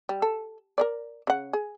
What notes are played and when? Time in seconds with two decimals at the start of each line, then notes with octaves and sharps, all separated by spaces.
0.09 G3
0.22 A4
0.78 A#4 B4 D5
1.27 C#3 F#5
1.53 G#4